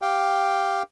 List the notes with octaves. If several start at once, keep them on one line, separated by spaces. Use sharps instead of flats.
G4 F5 G5